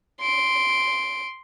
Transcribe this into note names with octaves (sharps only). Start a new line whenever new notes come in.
C6 D7